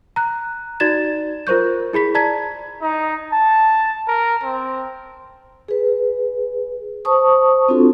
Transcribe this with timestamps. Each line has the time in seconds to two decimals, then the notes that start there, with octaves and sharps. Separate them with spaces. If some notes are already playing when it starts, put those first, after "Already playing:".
0.16 A#5 F#6
0.80 D#4 F#4 D5 G#6 A6 E7
1.47 F4 A#4 C5 C#6 G6
1.93 E4 G#4 B5 B6
2.15 D5 A5 A#5 G#6 B6
2.81 D#4
3.32 A5
4.08 A#4
4.43 C4
5.68 G#4 B4
7.05 C5 A5 C#6 D#6
7.68 C4 D4 F4 F#4 A4